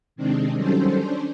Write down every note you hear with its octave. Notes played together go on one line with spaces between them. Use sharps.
C3 D#3 G#3 C4 D4
D#3 F#3 G3 C#4 A4 C5
C#4 D4 C5